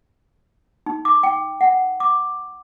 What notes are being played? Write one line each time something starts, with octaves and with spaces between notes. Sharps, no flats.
D#4
D6
G5
F#5
D6